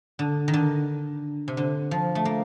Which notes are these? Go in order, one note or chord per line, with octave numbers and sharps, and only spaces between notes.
D3
D#3
D3
C3
D3
F3
A3
A#3